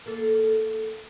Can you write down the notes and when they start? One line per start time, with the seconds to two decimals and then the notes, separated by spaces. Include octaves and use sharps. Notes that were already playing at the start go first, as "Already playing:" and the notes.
0.06 A#3 A4